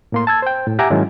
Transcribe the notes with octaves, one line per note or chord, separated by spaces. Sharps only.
A2 A#3 C6
A5 E6 G#6
C5 G5
A2
G4 E5 F#5 G#5 A#5 D6
G#2 D#3 F#3 G#3 C#4 E4